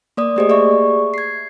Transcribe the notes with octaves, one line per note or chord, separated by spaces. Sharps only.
A#3 D5 D#6
A3 A#3 G4 G#4 C5 D#5
G#4 D5 E5 C#6
G#6 C7